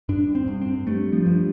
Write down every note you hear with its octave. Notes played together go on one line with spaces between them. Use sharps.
G2 D4
C4
G2
C4
G2 A3
F3
G2